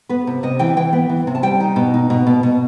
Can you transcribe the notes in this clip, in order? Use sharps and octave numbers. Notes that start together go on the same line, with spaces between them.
B3 B4
C3
C3 D#5
E3 G5
E3 G5
B3
E3
C3
A5
G3 G5
D#4
B2
D#4
B2
B2
B2